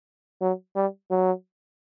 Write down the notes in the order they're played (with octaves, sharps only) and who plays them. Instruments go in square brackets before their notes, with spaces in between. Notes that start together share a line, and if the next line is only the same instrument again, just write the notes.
[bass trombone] F#3
G3
F#3